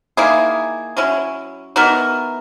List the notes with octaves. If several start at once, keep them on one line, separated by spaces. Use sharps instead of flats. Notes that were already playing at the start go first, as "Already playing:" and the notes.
D#3 A#3 E4 G#4
F#3 C#4 E4
E3 B3 D#4 F#4 A#4